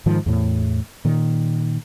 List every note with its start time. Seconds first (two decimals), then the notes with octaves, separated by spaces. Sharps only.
0.06 G#2 D#3 F3
0.26 E2 A2
1.05 A#2 D#3